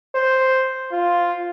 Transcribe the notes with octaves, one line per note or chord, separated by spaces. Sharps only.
C5
F4